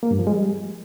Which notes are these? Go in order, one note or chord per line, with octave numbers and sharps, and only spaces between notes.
A#3
G2
F3
G#3
G3